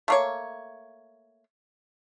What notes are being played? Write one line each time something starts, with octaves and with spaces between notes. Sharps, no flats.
A3 A#3 C#5